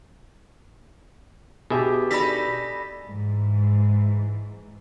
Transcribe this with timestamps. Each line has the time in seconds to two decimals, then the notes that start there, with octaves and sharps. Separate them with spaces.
1.70 B2 G4 G#4 E5
2.11 D#4 A4 D5 B5 A#6 B6
3.05 G#2 E3